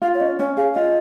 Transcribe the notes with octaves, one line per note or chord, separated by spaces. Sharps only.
F4 F5
C#5
C#4 D#5
C#4 C#5
G#4 F5
F4 D#5